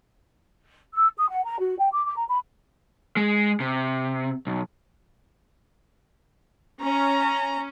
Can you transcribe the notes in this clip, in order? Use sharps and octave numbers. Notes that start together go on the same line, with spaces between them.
E6
D#6
F#5
A#5
F#4
G5
D6
D6
A#5
B5
G#3
C3
B1
C#4 A#5